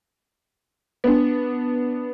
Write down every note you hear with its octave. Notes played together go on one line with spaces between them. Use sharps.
B3 D4